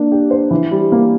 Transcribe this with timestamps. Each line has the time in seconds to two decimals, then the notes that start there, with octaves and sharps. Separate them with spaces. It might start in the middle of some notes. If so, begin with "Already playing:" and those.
Already playing: A#3 D4
0.12 G4
0.31 C5
0.51 E3
0.71 G3
0.92 A#3